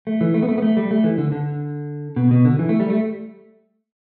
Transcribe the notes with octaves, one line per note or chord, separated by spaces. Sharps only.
A3
E3
A3
B3
A3
B3
A3
G3
A3
E3
D3
D3
B2
B2
D3
E3
A3
G3
A3